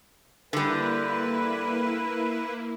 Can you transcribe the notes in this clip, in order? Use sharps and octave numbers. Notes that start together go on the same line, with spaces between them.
D3 G3 A#3 E4 B4